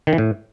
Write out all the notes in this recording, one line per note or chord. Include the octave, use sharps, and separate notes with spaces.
D#3
E3
A2